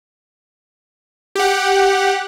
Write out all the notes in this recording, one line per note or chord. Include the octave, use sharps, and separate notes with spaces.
G4 F#5